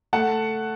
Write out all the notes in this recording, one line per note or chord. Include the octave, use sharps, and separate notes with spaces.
A3 F#5 A5